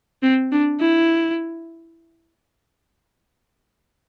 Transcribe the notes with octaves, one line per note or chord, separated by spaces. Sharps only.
C4
D4
E4